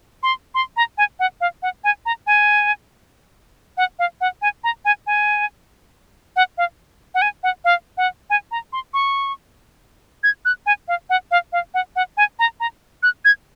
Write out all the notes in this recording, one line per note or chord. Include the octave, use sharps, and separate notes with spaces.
C6
C6
A#5
G#5
F#5
F5
F#5
G#5
A#5
G#5
F#5
F5
F#5
G#5
A#5
G#5
G#5
F#5
F5
F#5
G#5
F#5
F5
F#5
G#5
A#5
C6
C#6
G#6
F#6
G#5
F5
F#5
F5
F5
F#5
F#5
G#5
A#5
A#5
F#6
G#6